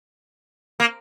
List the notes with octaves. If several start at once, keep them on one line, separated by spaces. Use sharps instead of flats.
A#3